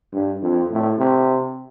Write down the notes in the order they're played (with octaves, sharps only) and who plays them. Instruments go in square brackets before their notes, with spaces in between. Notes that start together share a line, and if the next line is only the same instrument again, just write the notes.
[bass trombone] G2
F2
A2
C3